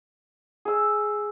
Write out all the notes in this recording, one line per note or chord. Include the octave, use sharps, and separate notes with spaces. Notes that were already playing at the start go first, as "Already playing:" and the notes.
G#4 E6